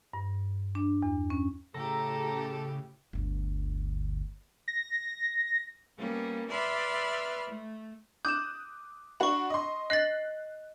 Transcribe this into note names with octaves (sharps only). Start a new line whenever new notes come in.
G2
D4
E2
C#4
A2 C#3 G4 A4 A#5
G1 D2
A#6
G3 A#3 B3 C#4
B4 D5 E5 B5 C6 F6
A3
D6 D#6 F#6 G6 E7
D4 F#4 B5 C#6
D#5 C6
D#5 F#6 A6 C7 F#7